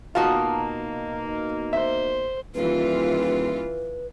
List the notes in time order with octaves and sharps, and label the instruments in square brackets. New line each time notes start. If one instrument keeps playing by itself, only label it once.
[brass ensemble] B2 A#3 D#4 [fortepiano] F4 F#4 [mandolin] A5 A#5 D#6
[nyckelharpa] C5 [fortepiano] E5
[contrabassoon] D#1 [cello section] E3 F4 [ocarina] B4